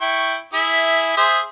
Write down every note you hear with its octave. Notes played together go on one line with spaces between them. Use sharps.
E4 G5 C#6
E4 G#4 E5
G#4 C5 E5